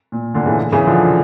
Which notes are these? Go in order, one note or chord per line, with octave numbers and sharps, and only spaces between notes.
A#2
A#2 D3
C#3 E3
C#3 E3
D3 F3